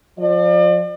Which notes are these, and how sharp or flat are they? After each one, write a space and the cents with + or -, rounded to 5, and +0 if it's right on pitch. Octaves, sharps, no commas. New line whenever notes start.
F3 +20 D5 +40